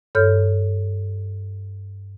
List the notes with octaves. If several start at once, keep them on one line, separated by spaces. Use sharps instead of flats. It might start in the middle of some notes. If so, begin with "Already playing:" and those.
G2 A4 C#5 F6 G6